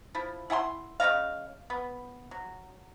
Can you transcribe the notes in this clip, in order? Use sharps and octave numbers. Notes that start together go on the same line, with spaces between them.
F3 E4
E4 F#5 G#5 C6
C#3 C#4 D#5 F5
B3
F#3